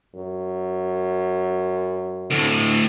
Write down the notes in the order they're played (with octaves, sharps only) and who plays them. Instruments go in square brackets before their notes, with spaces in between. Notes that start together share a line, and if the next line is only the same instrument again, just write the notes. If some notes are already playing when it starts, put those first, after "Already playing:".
[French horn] F#2
[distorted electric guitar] D2 A2